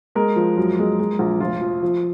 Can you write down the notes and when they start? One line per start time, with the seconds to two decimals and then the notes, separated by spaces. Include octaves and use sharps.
0.15 G#3 A#4
0.36 F3
0.57 F#2
0.79 G#3
1.00 G#3
1.19 A#1
1.40 F1 F4
1.61 F3
1.83 F3